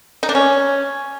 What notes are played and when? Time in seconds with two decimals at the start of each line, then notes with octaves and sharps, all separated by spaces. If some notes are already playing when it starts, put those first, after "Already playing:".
0.23 D#4
0.29 D4
0.35 C#4